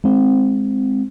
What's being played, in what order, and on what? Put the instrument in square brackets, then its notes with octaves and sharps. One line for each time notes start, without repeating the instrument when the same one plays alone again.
[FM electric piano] G#3 C4